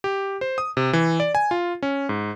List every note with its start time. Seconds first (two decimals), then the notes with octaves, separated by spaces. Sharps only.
0.04 G4
0.41 C5
0.58 D#6
0.77 C3
0.93 E3
1.20 D5
1.35 G#5
1.51 F4
1.83 C#4
2.09 G#2